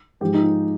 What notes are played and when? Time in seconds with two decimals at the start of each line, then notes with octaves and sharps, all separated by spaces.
0.21 G#2 F3 G#3 G4
0.34 D#4
0.42 F4